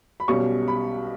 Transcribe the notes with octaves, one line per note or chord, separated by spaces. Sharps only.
B5
B1 B2 G3 C#4 C#6
B5